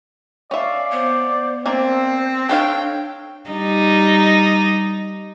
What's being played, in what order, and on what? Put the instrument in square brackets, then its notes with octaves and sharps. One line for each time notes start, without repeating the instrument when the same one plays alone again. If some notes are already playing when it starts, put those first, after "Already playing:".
[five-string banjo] C#4 E5 [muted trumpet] D5 [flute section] F5
[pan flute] B3 [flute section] C5 D6
[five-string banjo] A#3 D4 [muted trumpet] C4 [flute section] C5
[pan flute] D4 [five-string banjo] A4 C#5 F5 [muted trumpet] G5
[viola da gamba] G3 D#4